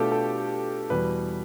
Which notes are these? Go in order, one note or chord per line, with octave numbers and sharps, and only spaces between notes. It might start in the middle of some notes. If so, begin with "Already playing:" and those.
Already playing: B2 A3 D4 F4 G4 A4
A4
E2 B2 G3 B4